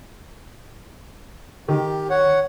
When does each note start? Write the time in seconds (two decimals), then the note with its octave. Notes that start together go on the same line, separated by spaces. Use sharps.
1.68 D#3 G4
2.10 C#5 F#5